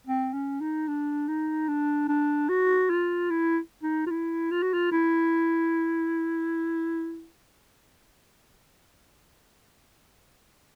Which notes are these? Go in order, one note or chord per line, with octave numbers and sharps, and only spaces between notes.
C4
C#4
D#4
D4
D#4
D4
D4
F#4
F4
E4
D#4
F4
E4
F4
F#4
F4
E4